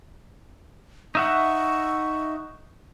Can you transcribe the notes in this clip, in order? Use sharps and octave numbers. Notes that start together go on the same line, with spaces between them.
D#4 E5 F#5 C#6